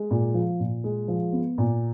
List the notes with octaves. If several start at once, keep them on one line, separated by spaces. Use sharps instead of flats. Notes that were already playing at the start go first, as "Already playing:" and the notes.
Already playing: G#3
A#2
F3
A#2
G#3
F3
B3
A#2